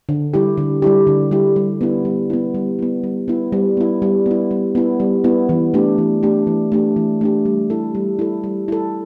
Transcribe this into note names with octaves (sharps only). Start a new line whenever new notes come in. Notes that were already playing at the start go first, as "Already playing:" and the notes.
D3
G3 E4 G4
D3
G3 E4 G4
D3
G3 E4 G4
G3
B3 E4
G3
B3 E4
G3
B3 E4
G3
B3 E4
G3
B3 E4
G3
B3 E4
G3
B3 E4
G3
B3 E4
E3
A3 D4 G4
E3
A3 D4 G4
E3
A3 D4 G4
E3
A3 D4 G4
G3
E4 A4
G3
E4 A4
G3
E4 A4